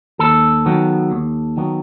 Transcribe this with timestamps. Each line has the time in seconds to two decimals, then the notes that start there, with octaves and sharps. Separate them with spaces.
0.19 D#2 A4
0.66 D#3 F#3 B3
1.11 D#2
1.57 D#3 F#3 B3